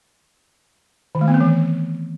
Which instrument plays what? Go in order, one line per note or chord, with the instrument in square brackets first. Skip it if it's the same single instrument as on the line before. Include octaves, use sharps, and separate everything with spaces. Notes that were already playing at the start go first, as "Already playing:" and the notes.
[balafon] D#3
A3
B3
C4
E3